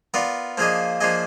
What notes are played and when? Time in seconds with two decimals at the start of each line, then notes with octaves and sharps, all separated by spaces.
0.14 B3 F4 A#4 D5
0.58 F3 A#3 D4 G#4 D#5
1.00 F3 A#3 D4 G#4 D#5